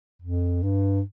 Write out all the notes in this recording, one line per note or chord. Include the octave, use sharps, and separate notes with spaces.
F2
G2